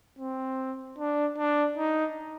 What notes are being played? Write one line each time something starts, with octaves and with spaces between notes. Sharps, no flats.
C4
D4
D4
D#4